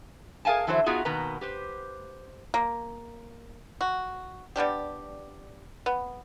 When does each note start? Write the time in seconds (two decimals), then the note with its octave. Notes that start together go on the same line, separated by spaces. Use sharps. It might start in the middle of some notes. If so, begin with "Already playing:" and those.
0.45 G#4 A#4 F5 G#5 A5
0.67 D3 E3 F#3 E4 A4 C5
0.86 B3 D#4 F4 F#4 G#4
1.05 B2 D#3 A#3 B4 A#5
1.41 G4 B4 C5
2.54 A#3
3.81 F#4
4.56 G3 B3 D4 G4
5.86 B3